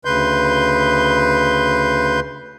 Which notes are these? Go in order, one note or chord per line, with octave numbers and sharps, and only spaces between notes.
D2 C#3 B4 C6 G6